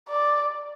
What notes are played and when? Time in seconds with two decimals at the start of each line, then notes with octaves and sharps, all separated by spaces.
0.09 D5